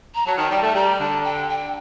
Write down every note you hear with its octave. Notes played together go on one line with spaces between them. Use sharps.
A#5
F#3 A5
D#3 A5
G3 G5
A3 A5
G3 A#5
D3 A5
G5
G5